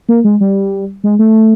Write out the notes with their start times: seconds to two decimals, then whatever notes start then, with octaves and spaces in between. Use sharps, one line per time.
0.09 A#3
0.24 G#3
0.41 G3
1.04 G#3
1.19 A3